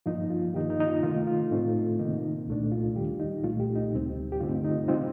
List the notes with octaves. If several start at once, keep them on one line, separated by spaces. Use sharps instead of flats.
G2 F3 A#3 D#4 F4
F4
G2 D#3 A#3 D#4 G4
D#4
D#4
F4
C3 D#3 A3 F4
F4
A2 A3 C4 D#4
C3 D#3 A#3 D#4
C2 A#2 A3 D4
F4
D#2 D#3 G3 G4
D#4
C2 A#2 A3 F4
G4
D#4
D2 C3 G3 C4
G4
G2 D3 A3 C4 D#4 F4
D#4
C3 G3 C4 D#4 F4